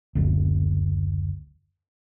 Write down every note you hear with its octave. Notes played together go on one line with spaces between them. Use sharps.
F#1 D2